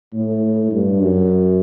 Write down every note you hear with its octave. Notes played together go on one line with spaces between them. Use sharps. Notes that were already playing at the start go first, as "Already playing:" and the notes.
A2
G2
F#2